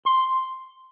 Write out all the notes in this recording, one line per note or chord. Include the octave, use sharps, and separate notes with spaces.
C6